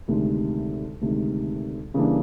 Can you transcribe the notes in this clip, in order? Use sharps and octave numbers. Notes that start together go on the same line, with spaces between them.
D2 C3 D#3 G#3
D2 C3 D#3 G#3
C#3 E3 G3 A#3 D4